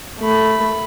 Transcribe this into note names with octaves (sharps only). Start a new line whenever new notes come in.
A3 B5